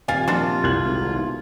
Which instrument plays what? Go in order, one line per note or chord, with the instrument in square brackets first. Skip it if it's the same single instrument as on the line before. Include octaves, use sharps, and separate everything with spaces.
[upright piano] D#1 [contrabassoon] C3 [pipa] F4 F5 G#5
[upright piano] A#2 F3 [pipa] D4 F#4 [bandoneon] F4
[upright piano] C2 G#6 F#7
[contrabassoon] G#1
B1